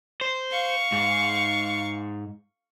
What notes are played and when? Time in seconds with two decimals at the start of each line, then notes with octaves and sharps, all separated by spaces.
0.21 C5
0.51 F5 C#6
0.92 G#2